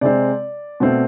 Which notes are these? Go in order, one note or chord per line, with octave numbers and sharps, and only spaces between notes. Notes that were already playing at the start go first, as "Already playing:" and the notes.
C3 G#3 C4 D5
B2 A3 C4